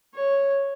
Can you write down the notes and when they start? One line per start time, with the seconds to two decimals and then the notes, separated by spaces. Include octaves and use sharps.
0.15 C#5